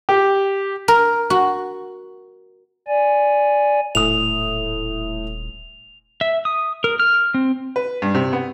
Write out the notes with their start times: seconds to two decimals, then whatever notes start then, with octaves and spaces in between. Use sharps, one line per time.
0.09 G4
0.88 A#4
1.30 F#4
2.87 D5 G#5
3.95 D#1 A2 D#6 F7
6.21 E5
6.45 D#6
6.84 A#4
7.00 F6
7.34 C4
7.76 B4
8.02 G2
8.15 C3
8.33 B3